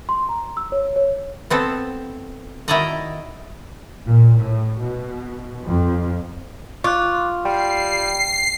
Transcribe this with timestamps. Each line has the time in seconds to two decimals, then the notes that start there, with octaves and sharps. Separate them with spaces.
0.09 C6
0.29 A#5
0.57 E6
0.72 C#5
0.96 C#5
1.50 B3 C4 A4
2.68 D#3 E4 F#4 D5 D#5 A#5
4.05 A#2
4.39 A2
4.80 B2
5.65 F2
6.84 F4 C#6 D6 F#6
7.45 G3 G5 C7